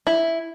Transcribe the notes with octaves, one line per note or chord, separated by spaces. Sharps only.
E4